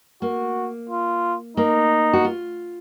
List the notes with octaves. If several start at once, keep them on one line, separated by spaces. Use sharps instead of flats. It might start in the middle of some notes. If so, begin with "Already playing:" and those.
A#3 F#4
F4
A#3 D#4
F#4
F4